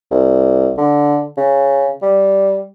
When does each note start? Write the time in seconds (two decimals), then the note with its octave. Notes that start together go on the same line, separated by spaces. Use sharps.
0.11 C2
0.78 D3
1.37 C#3
2.02 G3